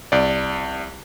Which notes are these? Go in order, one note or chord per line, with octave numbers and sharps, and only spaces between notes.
C2 D5